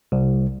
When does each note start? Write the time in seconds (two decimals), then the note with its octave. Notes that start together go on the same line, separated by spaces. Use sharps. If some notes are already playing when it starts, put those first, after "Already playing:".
0.12 C2